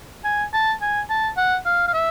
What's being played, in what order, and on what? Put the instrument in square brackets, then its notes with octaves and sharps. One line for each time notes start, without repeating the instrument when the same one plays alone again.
[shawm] G#5
A5
G#5
A5
F#5
F5
F5
E5